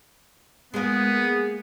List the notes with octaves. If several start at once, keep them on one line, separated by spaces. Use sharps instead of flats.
G#3 A#3 B3 G#4